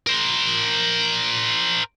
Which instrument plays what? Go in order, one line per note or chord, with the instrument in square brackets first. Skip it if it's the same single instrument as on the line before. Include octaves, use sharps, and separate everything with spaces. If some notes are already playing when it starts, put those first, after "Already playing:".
[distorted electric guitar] A#4 C5